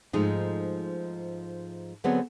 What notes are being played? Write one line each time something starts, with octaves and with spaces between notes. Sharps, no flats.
G#2 F3 G#3 A3 D#4
D3 F#3 B3 C4 G#4 C#5